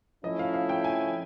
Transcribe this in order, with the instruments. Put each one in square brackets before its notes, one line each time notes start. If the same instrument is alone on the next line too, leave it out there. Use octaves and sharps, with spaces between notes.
[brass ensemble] F3 A3 C#4 E4 [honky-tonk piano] D#5
[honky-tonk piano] F5
F5
G5
G#5